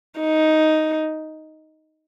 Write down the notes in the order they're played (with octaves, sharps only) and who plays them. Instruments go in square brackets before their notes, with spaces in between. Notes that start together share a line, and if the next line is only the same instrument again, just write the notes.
[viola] D#4